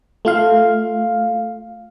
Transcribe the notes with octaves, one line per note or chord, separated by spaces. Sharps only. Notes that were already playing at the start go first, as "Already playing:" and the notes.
A3 F4 F5